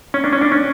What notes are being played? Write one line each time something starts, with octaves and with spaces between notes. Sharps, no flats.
C#4
D4
C#4
D4
C#4